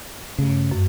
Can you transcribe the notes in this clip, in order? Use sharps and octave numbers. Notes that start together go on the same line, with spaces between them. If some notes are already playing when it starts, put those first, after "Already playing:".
G2 C#3 A3
F#2